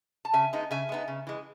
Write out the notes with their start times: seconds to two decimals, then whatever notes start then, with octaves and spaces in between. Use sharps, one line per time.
0.25 A5
0.33 C#3 E5 G#5
0.53 G#3 B3 D#4
0.71 C#3 E5 G#5
0.89 G#3 B3 D#4
1.08 C#3
1.27 E3 G#3